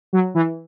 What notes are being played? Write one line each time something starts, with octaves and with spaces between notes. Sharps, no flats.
F#3
E3